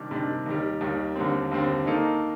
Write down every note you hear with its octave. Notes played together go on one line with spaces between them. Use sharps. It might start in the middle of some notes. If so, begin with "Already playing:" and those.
Already playing: C3 D#3 G3 D4
C3 D#3 G3 D4
D#2 D#3 G3
D#2 D#3 G3
D#2 D3 G3 C4
D#2 D3 G3 C4
D#3 A#3 D#4 A4